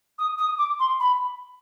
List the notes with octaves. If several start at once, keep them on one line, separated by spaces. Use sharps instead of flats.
D#6
D#6
D6
C6
B5